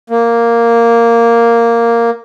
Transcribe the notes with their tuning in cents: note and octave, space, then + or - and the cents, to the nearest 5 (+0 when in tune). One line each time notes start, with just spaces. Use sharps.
A#3 -5